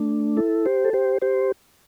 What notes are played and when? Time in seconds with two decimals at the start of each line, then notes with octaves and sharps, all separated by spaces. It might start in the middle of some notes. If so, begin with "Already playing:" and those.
Already playing: A3 D4
0.37 E4 A4
0.66 G4 C5
0.85 A4
0.93 G4 C5
1.22 G4 C5